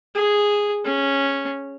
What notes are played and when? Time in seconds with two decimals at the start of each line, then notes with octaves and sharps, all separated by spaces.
0.15 G#4
0.85 C#4